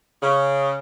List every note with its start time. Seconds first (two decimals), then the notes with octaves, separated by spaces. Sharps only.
0.22 C#3